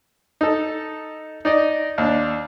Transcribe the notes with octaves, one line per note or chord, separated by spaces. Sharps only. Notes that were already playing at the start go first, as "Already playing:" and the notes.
D#4 A4
D#4 D5 D#5
D#2 D4